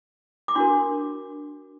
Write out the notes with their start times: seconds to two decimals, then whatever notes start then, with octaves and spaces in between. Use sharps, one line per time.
0.48 D6
0.55 D4 F#4 A#4 C6